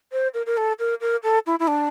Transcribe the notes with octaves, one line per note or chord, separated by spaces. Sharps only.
C5
A#4
A#4
A4
A#4
A#4
A4
E4
E4
D4